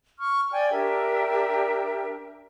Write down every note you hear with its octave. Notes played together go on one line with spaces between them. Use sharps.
C#6 F6
D5 G5 G#5
D4 G4 A#4 E5